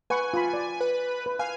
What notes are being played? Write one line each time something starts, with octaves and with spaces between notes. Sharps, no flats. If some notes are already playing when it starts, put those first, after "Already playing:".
B4 F#5 G#5 C#6
F4 B5
D5
B4
B4
F5 G#5